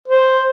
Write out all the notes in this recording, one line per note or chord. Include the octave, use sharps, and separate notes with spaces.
C5